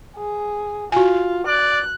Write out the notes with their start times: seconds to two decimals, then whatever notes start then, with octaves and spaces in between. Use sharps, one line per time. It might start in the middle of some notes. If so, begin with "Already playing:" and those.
0.17 G#4
0.92 F4 F#4 G#5
1.47 D5 F#6